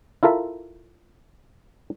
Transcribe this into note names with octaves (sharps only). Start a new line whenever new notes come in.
E4 F4 A4 A#4 E5